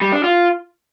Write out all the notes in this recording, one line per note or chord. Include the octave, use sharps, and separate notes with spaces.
G3
D4
F4